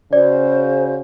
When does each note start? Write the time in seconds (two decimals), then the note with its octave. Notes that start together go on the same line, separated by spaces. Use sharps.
0.13 C#3 F#4 C5 D5